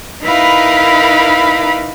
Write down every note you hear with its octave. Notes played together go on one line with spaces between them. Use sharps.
D#4 E4 A#4 B4 F5 B5